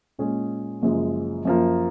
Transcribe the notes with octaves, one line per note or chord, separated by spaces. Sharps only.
A#2 G#3 C#4 G#4
F#1 F#2 F3 G#3
F#2 F3 A#3